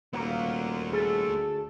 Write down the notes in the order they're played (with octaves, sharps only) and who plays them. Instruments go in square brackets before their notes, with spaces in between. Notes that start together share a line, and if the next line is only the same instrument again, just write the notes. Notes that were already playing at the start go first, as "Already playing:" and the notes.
[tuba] D#1 [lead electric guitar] A3 F#4 [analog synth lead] A#3
[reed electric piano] G#4 [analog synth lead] A4
[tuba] D2